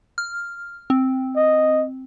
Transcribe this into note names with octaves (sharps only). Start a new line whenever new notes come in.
F6
C4
D#5